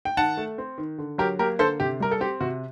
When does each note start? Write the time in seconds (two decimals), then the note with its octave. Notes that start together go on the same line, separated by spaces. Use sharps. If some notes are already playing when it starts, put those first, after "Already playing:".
0.05 G5
0.17 D#3 F#5 A5
0.37 A3
0.58 C4
0.78 D#3
0.98 D3
1.18 F#3 G4 A#4
1.39 A#3 G4 A#4
1.59 D3 A4 C5
1.80 C3 G4
2.00 G3 A#4
2.11 A4
2.21 C4 G4
2.41 C3 F#4